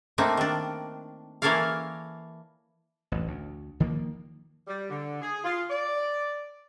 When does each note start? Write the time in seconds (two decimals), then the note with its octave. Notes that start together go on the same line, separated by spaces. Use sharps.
0.18 A3 A#3 C4 D4 D#4
0.37 D#3 D4
1.42 E3 A#3 A4 C#5 D5 F5
3.12 A1 F2
3.28 D2
3.80 D#3 F3 A#3
4.67 G3
4.89 D3
5.22 G#4
5.44 F4
5.70 D5